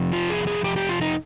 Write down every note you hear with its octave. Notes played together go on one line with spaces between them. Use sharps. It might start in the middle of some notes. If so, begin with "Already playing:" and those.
Already playing: F2 C3 F3
F4
G#4
G#4
G4
G4
F4
D#4